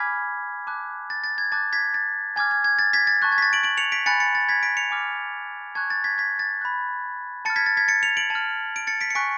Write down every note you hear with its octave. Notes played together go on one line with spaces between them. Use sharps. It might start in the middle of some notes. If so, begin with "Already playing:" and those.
Already playing: G#5 B5 D6 F6 G#6 B6
A5 D6 F#6
A6
A6
G#6
A5 D6 F#6 A6
G#6 B6
A6
G#5 D6 F6 G#6
G#6
G#6
A6
G#6 B6
A6
A5 C#6 F#6 A6
G#6
B6
A6
D7 F#7
D7 F#7
C#7 F7
B6 D7
G#5 B5 F#6 A6 C#7
A6 C#7
A6
G#6 B6
B6 D7
C#7 F7
G#5 D6 F6
A5 C#6 F#6 G#6
A6
G#6 B6
G#6 B6
A6
B5 F#6
A5 F6 A6 C#7
G#6 B6
A6
G#6 B6
A6 C#7
C#7 F7
D7 F#7
A5
F6
D7
A6 C#7
B6 D7
C#7
G#5 C#6 F#6 B6 D7